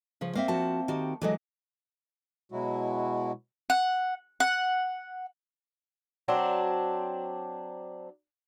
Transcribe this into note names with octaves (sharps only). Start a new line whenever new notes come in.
C#3 F3 F4
A#3 C4 E5 F5
F3 F#4 A5
D#3 F#4 G4
D2 E3 F#3 G#3 A4 D#5
B2 F#3 G#3 E4 F#4
F#5
F#5
F#3 C4 D4